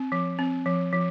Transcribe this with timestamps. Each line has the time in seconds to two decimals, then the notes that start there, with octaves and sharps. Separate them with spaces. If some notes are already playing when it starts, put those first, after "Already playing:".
Already playing: C4
0.12 F3
0.39 C4
0.66 F3
0.93 F3